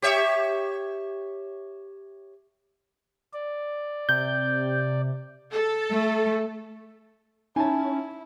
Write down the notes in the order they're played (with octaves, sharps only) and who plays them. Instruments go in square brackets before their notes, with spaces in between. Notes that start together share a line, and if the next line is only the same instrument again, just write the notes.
[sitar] G4 C#5 E5
[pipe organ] D5
[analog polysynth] C3 [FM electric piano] G6
[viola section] A4
[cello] A3
[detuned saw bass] C#4 [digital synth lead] D#4 [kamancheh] E4 [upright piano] G#5 A5